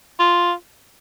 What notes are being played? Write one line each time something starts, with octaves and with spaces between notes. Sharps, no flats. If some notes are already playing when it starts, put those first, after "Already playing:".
F4